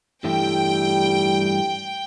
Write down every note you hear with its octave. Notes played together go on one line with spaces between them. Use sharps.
G2 E3 G3 A3 G5